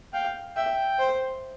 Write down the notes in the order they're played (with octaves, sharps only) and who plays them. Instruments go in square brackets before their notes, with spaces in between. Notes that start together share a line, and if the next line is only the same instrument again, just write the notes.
[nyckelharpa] F5 [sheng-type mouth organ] G5
[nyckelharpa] E5 [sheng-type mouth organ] G5
[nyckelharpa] C5